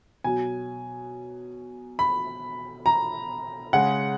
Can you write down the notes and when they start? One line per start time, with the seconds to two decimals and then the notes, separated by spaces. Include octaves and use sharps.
0.24 B2 F#3 G#5
1.99 B5
2.86 A#5
3.73 C#3 G#3 F#5